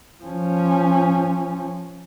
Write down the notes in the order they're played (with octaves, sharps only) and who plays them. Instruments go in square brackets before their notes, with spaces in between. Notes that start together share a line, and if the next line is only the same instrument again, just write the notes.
[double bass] F3 C#4